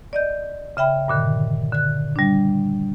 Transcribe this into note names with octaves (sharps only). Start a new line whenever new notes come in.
D5 D#5 G6
C#3 E5 G5 B5 F6
G2 A#2 D3 D#3
D3 F#6
G3 D4